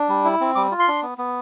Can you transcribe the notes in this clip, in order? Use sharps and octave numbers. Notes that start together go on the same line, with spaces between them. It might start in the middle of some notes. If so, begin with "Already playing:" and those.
Already playing: D4
G3
E4
C4
G3 D6
F4
C6
D4
B3
B3